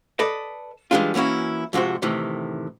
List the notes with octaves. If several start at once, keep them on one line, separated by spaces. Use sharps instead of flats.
A4 B4 D5 D#5
E3 F3 G3 G#3 D4 F4
E3 A#3 C#4 E4 F#4
F2 G#2 C3 F#4 C5
A2 C3 D#3 E3